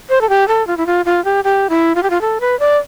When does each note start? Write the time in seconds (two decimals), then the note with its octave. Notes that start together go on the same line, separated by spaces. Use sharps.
0.10 C5
0.21 A4
0.29 G4
0.48 A4
0.67 F4
0.77 E4
0.86 F4
1.05 F4
1.25 G4
1.44 G4
1.69 E4
1.95 F4
2.03 G4
2.10 F4
2.21 A4
2.40 B4
2.60 D5